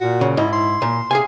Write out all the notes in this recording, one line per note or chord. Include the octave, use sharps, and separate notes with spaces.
A#2 F#4
C#3
G#2 E4 D#5
C6
A#2
C3 G#4 F5 G#5